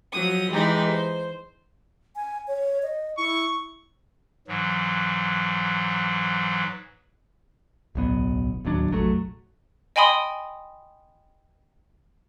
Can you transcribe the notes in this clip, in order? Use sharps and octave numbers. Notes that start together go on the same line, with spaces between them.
F3 F#3 D#6
E3 G#3 D#4 G4
C5
G#5
C#5
D#5
E4 C#6
G#2 E3 F#3
D1 B1 B3
D1 D#2 F#3 D4
F1 A#1 F#3 A3
D#5 G5 G#5 B5 C6 D#6